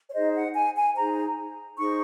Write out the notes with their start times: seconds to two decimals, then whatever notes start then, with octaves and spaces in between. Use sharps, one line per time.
0.09 C#5
0.14 D#4 G#4 C5 D#5
0.35 F#5
0.55 G#5
0.76 G#5
0.96 D#4 G#4 C5 A#5
1.78 D#4 G#4 C5 C#6